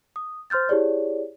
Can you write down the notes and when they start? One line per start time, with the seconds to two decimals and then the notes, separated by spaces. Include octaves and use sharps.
0.16 D#6
0.50 C5 C6 F6 G6 A6
0.69 E4 G4 G#4 C#5 D5